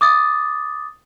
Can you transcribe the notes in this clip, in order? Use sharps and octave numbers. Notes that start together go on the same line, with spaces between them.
D6 D#6 A6